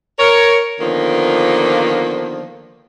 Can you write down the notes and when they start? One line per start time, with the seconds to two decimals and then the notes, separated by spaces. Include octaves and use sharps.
0.19 A#4 C#5
0.80 D3 D#3 F3 A#3 B3 F4